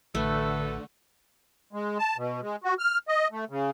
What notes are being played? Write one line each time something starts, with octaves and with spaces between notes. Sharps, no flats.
A1 D3 A3 F#4 A4 B4
G#3
A5
B2
G#3
F#4
F6
D#5
A3
C#3